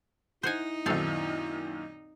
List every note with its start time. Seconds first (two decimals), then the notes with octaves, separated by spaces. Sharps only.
0.43 D#4 E4 C5 F#5 G#5
0.86 F#2 A#2 D#3 C4 A4 F5